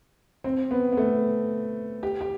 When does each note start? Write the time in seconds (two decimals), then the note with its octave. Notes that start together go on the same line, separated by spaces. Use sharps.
0.44 C4
0.71 B3
0.92 B3
0.97 A3
2.03 G4
2.21 G4